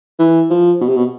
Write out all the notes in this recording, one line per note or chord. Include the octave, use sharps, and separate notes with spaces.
E3
F3
B2
C3
B2